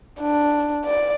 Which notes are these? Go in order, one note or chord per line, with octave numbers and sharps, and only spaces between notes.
D4
D5